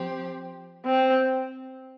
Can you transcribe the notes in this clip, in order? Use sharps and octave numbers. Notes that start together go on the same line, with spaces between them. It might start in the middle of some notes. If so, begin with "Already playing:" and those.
Already playing: F3 C4 G4
C4